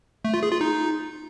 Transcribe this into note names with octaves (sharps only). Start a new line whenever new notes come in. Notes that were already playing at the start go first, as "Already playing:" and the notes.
A3
F4
G#4
F4
D#4